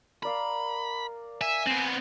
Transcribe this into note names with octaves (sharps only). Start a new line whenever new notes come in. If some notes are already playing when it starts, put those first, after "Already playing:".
A#4 D5 F5 B5
E5 G#5
B3 C4